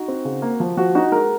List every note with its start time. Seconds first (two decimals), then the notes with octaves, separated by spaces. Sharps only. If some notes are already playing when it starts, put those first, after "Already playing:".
Already playing: D#4 F#4
0.08 C4
0.25 C#3
0.42 A#3
0.60 F3
0.77 F3 F#4
0.95 D#4 F#4
1.11 G#3 A#4